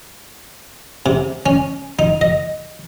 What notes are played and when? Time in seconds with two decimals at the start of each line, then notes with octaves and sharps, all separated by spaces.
1.06 C3
1.46 C#4
1.99 D#4
2.21 D#5